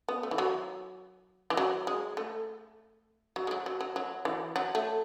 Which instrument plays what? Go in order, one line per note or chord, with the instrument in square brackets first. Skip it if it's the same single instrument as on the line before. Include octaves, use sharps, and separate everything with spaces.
[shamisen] B3
A3
E3
F#3
E3
F#3
G#3
A3
F#3
G#3
F#3
F#3
F#3
F#3
E3
F#3
A3